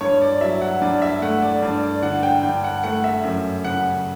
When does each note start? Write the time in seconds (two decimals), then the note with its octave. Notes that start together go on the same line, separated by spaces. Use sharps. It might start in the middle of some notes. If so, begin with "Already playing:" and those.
0.01 G2 C#5
0.22 D5
0.41 F#3 E5
0.61 F#5
0.82 G2 D5
1.02 E5
1.22 A3 F#5
1.42 D5
1.62 G2 D5
1.83 D5
2.02 D3 F#5
2.23 G5
2.43 G2 G5
2.64 F#5
2.84 A3 F#5
3.04 E5
3.24 F#2 E5
3.64 C#3 F#5